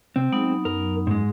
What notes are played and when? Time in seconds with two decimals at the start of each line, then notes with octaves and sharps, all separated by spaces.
0.16 C3 C4
0.32 F#3 G#3 B3 D#4
0.65 F#2 A#4
1.07 G#2 G#3